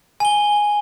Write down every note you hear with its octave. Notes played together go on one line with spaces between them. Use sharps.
G#5 G7